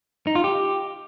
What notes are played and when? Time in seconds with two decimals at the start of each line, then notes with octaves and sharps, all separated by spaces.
0.27 D#4
0.35 F4
0.44 G4